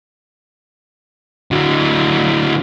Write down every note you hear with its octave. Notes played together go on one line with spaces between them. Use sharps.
D3 F#3